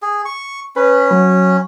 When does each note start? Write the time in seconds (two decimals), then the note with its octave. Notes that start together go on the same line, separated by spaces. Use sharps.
0.02 G#4
0.25 C#6
0.76 C#4 B4
1.11 F#3